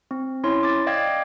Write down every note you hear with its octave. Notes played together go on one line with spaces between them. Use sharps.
C4
C#4 E4 C#5 C6
D6 A6
D5 D#5 F5 G5 D6 G#6